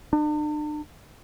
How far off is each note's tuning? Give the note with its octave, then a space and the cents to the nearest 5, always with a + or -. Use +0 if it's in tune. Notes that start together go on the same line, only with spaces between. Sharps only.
D4 +40